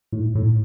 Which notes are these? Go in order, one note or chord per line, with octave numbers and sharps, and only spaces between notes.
A2
A2